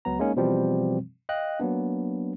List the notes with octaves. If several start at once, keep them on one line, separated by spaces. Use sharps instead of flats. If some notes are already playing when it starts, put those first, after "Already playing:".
C#2 F#3 B3 A#5
G#3 A#3 C#4 D#4
B2 E3 F3 G3 C4
D#5 F5 G5 F#6
F#3 A#3 B3 D4